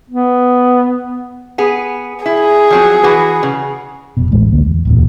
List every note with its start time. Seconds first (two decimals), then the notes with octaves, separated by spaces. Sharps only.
0.10 B3
1.58 B3 G#4
2.26 E4 G#4
2.71 F3 F#3 C4
3.03 E3 F#4 B4
3.43 C#3
4.17 F1 B2
4.31 D#1 A1 G#3 A3
4.52 D2 D3 A#3
4.66 E2
4.85 D1 E2 A#2